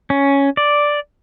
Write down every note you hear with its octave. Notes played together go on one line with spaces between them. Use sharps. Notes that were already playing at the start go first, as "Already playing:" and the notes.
C#4
D5